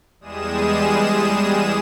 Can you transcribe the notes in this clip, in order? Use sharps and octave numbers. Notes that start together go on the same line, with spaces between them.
E2 G3 G#3 G#4 D#6 E7